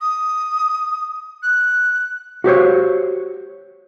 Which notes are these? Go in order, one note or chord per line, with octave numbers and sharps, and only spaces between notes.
D#6
F#6
F#4 G4 C5 C#5